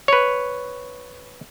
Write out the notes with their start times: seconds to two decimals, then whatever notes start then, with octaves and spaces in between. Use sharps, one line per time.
0.08 B4 C#5